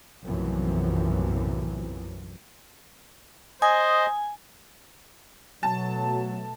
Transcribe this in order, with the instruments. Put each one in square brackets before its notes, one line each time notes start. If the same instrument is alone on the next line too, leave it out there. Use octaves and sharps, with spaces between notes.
[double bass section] B1 F#2 A2 C3 E3 F3
[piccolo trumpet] C5 [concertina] D#5 [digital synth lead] G#5 [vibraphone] D#6
[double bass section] B2 A3 [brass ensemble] F#3 [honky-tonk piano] A5